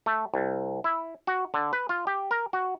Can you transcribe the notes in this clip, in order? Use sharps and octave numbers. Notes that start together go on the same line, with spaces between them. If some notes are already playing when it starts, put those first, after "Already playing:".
A3
C2
E4
F#4
D3
B4
F4
G4
A#4
F#4